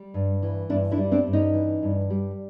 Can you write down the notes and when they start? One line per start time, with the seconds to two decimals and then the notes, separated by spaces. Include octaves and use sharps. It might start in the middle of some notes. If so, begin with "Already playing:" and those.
Already playing: G3
0.14 G2
0.42 E3
0.70 G2 D4 E4
0.92 D4 E4
0.98 G3
1.11 C4 D4
1.27 G2
1.33 C#4 D#4
1.54 E3
1.83 G2
2.10 G3